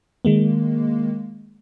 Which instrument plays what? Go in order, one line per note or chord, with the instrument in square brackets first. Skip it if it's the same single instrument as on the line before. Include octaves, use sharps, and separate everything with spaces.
[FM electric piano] D#3 G#3 A#3